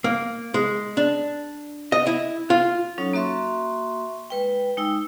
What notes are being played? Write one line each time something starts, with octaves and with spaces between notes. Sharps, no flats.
A#3
G#3
D4
D#5
E4
F4
F#3 C#4 D#4 A4 C#5
A#3 F#4 E5 C6 C#6
G#3 B4 G5
G#3 D#4 G5 E6